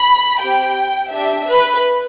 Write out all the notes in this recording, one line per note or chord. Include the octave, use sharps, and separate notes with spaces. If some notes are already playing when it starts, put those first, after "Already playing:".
Already playing: B5
C4 G4 G5
D4 G4 E5
B4